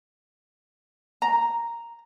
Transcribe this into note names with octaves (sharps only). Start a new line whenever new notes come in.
A#5